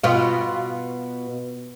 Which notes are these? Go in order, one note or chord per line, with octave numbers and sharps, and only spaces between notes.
B2 F4